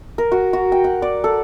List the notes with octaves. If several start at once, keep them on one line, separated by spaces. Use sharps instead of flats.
A#4
F#4
F#4
G5
F#5
D5
A4